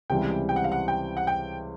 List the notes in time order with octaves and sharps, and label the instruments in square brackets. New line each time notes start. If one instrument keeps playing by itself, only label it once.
[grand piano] C#2 C3 E3 G3 [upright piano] G5
[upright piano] G5
F#5
F5
F#5
G5
F#5
G5